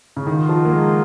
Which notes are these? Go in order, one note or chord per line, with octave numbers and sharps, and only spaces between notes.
C#3
D#3 F4 A#4 D#5 F#5
F3
A#3
G#3